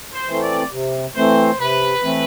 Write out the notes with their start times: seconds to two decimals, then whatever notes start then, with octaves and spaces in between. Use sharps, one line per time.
0.13 C5
0.28 E3 A3 C4
0.43 D5
0.71 C3
1.16 E3 A3 C4 C5
1.59 C3 B4
2.03 E3 A3 C4